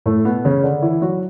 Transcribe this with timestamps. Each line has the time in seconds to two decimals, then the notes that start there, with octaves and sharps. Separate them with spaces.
0.06 A2 A3
0.25 B2 B3
0.45 C#3 C#4
0.63 D3 D4
0.82 E3 E4
1.02 F#3 F#4